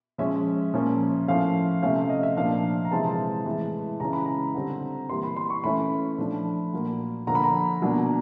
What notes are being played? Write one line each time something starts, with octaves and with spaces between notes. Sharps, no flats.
F3 G#3 C#4 E5
A#2 F3 A#3 C#4
A2 F3 A3 C#4 F5
C3 F3 A3 C#4 F5
E5
D#5
E5
A#2 F3 A#3 D4 F5
A#5
C3 E3 G#3 C4 A5
A2 E3 G#3
C#3 E3 G#3 C#4 A#5
B5
A#5
D3 G3 C4
E3 G3 A#3 C6
B5
C6
C#6
E3 A3 C#4 B5
F3 A3 D4
A#2 F#3 A#3
D3 F3 A#3 A#5
B5
A#5
B2 F#3 A#3 D4